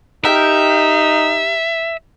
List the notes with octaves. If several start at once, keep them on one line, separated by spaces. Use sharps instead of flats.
D#4 G4 A#4 E5